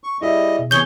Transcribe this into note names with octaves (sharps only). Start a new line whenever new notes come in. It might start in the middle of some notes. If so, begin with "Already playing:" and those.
C#6
G3 E4 G#4 D#5 E5
B2
C3 E3 B3 G#4 C#5 C#6 G6 G7